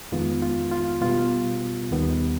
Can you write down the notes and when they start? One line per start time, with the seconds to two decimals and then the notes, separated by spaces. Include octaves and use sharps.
0.12 F2 D#3 G#3 B3 F4
0.42 F4
0.71 F4
1.01 B2 G3 B3 F4
1.91 D#2 D#3 G3 B3